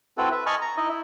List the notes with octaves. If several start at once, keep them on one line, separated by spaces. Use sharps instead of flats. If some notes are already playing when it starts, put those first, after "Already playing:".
C4 E4 F#4 A4 B4
B4 E5
D#5 G#5 A5 B5 C#6 F6
A#5
D#4 E4 D#5
E4